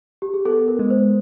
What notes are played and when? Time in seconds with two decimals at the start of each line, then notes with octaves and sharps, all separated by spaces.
0.22 G4
0.34 G#4
0.45 B3 A4
0.68 A#4
0.79 G#3
0.90 C5